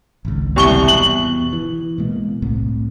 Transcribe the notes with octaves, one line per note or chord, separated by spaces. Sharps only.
G#1 C#2
C2 C#6 G7
E2 B2 F#7
E3
B2 G#3 A#3
C2 A2 C3